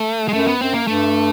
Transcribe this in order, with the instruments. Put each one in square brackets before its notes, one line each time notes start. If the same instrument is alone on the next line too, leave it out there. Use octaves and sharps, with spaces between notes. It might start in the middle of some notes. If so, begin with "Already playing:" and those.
Already playing: [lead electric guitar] A3
G#3
[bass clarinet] F#2 [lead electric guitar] A3
[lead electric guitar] B3
[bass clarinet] F#2 [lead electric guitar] C4
[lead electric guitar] A#3
[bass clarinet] G2 [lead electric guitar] A3